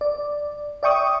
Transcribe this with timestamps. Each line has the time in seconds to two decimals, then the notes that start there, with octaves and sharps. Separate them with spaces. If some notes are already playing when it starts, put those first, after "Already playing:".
0.01 D5
0.83 D5 E5 G5 C#6 D#6